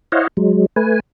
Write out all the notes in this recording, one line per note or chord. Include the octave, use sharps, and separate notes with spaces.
E4 C5 C#5 D#5 F5 F#5
F#3 G#3
A3 B4 G#5